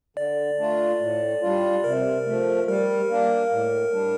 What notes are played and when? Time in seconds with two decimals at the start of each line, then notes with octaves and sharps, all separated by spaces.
0.17 D3 D5
0.59 A3 D4 F4
1.00 A2
1.42 G3 D4 F4
1.84 C3 A#4
2.26 F3 A3
2.67 G3 A#4
3.10 A#3 D4
3.51 A2
3.93 G3 D4